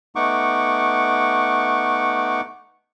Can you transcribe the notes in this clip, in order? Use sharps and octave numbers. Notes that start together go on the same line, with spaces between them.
A3 B3 D#4 F#5 C#6 D6